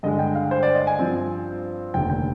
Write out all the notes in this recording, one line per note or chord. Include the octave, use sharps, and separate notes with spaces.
G2 D3 G#3 D#5
G5
F5
C5
D5
D#5
G#5
G2 F3 C4
F1 D#2 D3 G5
G5